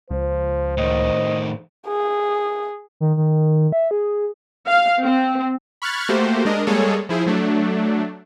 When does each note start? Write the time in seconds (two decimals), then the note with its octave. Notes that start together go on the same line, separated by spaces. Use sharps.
0.11 C#2 F3 C5
0.78 A2 D#3 D#5
1.87 G#4
3.00 D#3
3.17 D#3
3.72 E5
3.91 G#4
4.68 F5
5.02 C4
5.82 B5 C#6 F6 F#6 G#6 A6
6.09 A3 A#3 F#4 G4 C5
6.45 G#3 D4 A#4 D#5
6.67 G3 G#3 A#3 G#4 A4 C#5
7.09 F3 E4 G#4 C5
7.26 F#3 A3 D4